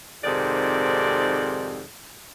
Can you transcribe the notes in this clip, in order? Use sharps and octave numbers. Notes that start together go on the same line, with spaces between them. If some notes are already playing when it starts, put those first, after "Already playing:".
F2 G#2 C3 D#3 A4 D5